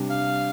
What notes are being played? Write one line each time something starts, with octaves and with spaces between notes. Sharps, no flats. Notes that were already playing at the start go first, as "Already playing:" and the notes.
Already playing: C3 G3 D4 G4
F5